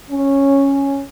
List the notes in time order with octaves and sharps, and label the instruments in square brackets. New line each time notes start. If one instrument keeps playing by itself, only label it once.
[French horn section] C#4